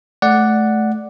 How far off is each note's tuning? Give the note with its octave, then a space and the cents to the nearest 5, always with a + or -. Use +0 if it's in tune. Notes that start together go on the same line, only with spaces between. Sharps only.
A3 -20 D5 +0 F#5 +0